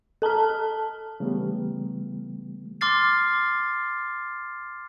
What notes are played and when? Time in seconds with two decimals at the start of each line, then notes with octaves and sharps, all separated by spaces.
0.22 A4 A5 A#5 F6
1.20 C#3 E3 G3 A3 B3 G4
2.81 C6 D6 F6 A6 C7